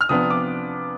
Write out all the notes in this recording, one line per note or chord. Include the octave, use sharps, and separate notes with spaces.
F6
C3 F3 B3 D4 D#6
D6